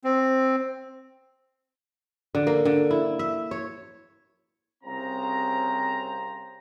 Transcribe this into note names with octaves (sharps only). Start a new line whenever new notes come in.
C4
D3
A#3
D3
E4
E5
C#5
C2 C#3 C4 C5 A#5